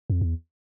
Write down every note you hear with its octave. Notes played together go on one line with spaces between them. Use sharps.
F2
E2